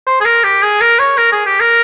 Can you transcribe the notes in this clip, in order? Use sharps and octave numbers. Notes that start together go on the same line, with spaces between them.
C5
G#4
A#4
G4
G#4
A#4
C#5
A#4
G#4
G4
A#4